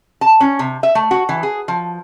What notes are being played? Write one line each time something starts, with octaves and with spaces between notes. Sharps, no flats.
A5
C#4
C3
E5
A3
F#4
E3
G#4
F3